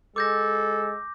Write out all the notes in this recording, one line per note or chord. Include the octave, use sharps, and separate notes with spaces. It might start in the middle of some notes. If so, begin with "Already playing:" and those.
G#3 A4 D6 G6 A#6